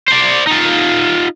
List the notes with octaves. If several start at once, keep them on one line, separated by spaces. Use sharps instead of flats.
C5 D5
D#4 F4